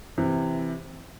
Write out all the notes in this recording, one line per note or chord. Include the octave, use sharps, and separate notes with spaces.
C3 E3